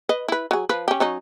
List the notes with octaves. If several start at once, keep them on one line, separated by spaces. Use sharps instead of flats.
B4 D#5
E4 B4
F#3 G#4
F3 B4
C#4 G4
F#3 C#4 D#4